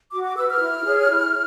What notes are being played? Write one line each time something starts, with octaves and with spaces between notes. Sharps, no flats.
F#4 D6
D6
B4 E6
F6
E4
G#4 C#5
E4